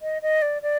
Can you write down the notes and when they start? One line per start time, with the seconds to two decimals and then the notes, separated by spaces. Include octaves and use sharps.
0.02 D#5
0.22 D#5
0.42 D5
0.62 D5